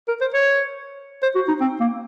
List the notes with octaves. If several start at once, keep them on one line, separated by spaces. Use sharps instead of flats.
A#4
C5
C#5
C5
F#4
D#4
C4
A#3